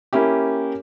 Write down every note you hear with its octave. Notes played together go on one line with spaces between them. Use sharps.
A#3 C#4 E4 G4